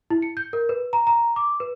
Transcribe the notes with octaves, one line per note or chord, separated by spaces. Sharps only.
E4
C#7
G6
A#4
B4
A#5
A#5
D6
B4